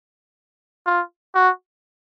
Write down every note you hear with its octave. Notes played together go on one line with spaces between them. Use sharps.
F4
F#4